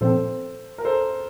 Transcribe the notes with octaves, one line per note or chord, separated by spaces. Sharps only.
A#2 F3 C4 A4 C5
A#4
A4 C5